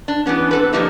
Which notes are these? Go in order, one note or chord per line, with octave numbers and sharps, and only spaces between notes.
D4
E3 G3 B3 C#4
C4 A4 B4
C3 F3 G3 A3 A#3 D#4